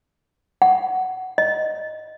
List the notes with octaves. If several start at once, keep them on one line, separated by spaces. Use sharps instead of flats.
F#5
D#5